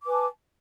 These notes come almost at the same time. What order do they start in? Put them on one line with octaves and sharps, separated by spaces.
D6 B4 G#5 A5